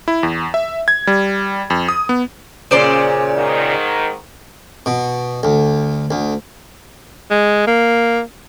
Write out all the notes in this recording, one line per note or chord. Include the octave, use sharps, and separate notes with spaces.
E4
E2
E5
G#6
G3
F2
D#6
B3
A#2 C#3 C5 D5 C6
G#2 D#3
B2
D2
D2
G#3
A#3